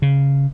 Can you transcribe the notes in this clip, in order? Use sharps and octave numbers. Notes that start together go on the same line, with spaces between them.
C#3